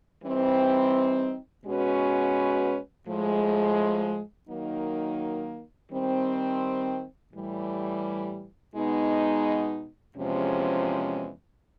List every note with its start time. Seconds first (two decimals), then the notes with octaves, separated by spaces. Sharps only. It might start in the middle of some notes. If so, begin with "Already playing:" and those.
0.23 E3 G3 C4 D#4
1.65 B2 G#3 C#4 F#4 B4
3.07 A2 F3 G#3
4.49 D#3 F#3 A#3 D#4
5.91 D#3 G3 C4
7.33 A2 E3 G3
8.75 B2 G#3 B3 D#4
10.17 E2 C3 F3 G#3 C#4